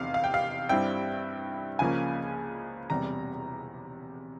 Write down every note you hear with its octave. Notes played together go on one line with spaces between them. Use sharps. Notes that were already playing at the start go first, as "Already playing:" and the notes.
Already playing: F1 E2 C3 F5
F5
G5
F5
G2 G3 C4 E4 G5
C#2 C#3 F3 A#3 C#4 G#5
E1 E2 C3 G3 A#5